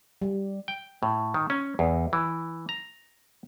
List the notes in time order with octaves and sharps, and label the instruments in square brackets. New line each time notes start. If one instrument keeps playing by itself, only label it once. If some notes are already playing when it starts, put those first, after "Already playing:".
[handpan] G3
[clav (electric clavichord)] G5
A2
D#3
C#4
E2
E3
A#5